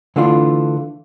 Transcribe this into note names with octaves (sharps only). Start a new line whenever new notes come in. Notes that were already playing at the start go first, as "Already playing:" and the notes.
D3 E3 A3 D4 F4